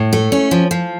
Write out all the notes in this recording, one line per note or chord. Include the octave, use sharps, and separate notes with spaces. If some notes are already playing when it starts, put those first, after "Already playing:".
Already playing: A2
A3
C#4
F3
F3